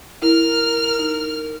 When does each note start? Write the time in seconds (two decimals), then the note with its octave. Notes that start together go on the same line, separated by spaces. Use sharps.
0.22 E4 A#4 F6
0.99 D#4